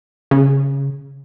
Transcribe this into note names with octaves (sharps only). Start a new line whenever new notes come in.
C#3